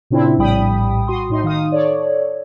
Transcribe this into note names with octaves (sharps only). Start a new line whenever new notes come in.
A#2 C#3 C4 D4 E4
A#1 A2 G3 G5 B5 D#6
F#4 C6 D#6
A2 D#4 C6
D#3 D#4 F5 D#6
A4 C#5 D5